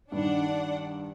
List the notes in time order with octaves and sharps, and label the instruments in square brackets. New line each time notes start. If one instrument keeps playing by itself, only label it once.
[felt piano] G2 D#3 [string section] D4 F#5